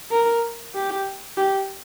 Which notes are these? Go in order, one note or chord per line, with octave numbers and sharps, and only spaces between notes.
A#4
G4
G4